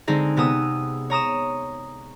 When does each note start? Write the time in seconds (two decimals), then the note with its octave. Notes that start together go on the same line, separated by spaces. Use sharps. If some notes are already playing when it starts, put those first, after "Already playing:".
0.07 D3 G#3 C4 D#4 G#4
0.37 C3 B3 G#4 D#6 E6
1.10 C#5 A#5 D#6 E7